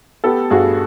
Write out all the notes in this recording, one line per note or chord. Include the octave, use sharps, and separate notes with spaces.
B3 G4 A4
G2 F#4 G#4